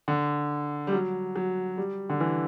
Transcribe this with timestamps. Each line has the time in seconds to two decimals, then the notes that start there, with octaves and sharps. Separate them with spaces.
0.08 D3
0.87 G3
0.93 F#3
1.36 F#3
1.77 G3
2.10 D3
2.21 E3